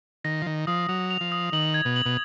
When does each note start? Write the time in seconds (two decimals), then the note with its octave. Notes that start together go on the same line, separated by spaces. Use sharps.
0.24 D#3 A#6
0.42 F3
0.46 D#3 A#6
0.67 F3 D#6
0.89 F#3 F7
1.11 F7
1.21 F3
1.32 D#6
1.52 D#3 F#7
1.74 G#6
1.85 B2
1.96 F#7
2.06 B2